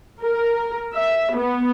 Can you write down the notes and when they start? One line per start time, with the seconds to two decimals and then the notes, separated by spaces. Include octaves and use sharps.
0.21 A#4
0.94 E5
1.36 B3